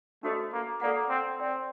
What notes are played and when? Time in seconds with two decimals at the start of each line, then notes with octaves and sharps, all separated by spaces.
0.23 A3 D4 F#4 A4 C5 D#5
0.53 A#3
0.81 A#3 A4 D5 F#5
1.09 C4
1.39 C4 A#4 D5 G5